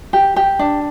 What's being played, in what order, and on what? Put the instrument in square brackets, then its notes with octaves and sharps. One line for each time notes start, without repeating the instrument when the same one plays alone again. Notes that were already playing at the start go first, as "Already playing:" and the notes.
[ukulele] G4
G4
D4